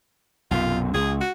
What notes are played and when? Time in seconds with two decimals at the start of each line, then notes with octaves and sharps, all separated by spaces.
0.51 B1 F#2 C3 F4
0.94 C#2 G#4
1.21 F#4